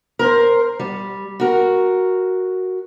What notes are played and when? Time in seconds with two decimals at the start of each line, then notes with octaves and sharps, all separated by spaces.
0.19 A#4 C5
0.79 G3
1.40 F#4 A#4